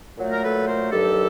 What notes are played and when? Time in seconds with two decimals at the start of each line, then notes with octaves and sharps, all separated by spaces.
0.18 A#2 F#3 A3
0.31 A#4
0.43 A4 B4
0.67 A#4 C5
0.91 G2 D#3 F#3 G4 A4